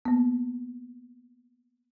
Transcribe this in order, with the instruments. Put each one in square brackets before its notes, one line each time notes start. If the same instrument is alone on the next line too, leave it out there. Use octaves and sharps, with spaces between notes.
[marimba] A#3 B3